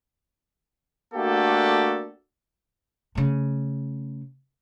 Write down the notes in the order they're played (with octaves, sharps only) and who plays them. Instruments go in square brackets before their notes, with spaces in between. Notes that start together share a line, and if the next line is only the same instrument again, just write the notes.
[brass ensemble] A3 A#3 D4 F#4 G4 A4
[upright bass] C#3 A3